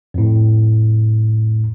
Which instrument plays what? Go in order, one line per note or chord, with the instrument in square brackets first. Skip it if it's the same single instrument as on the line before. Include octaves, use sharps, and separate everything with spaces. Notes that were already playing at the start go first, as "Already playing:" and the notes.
[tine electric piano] F2 A2